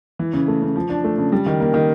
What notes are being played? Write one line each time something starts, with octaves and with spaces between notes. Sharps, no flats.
E3
C#3
A3
C#3
F3
D4
A3
C#3
G3
D#3
A#3
D#3